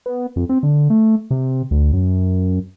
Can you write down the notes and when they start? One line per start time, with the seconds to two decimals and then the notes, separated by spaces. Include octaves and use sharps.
0.06 B3
0.36 F2
0.49 C4
0.63 D3
0.90 A3
1.31 C3
1.71 D2
1.93 F#2